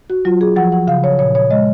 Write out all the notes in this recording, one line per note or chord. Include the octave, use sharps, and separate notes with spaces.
F#4
F#3 F4
G#4
F3 F#5
F#5
C#3 F5
C#5
A#2 C#5
C#5
G#3 D#5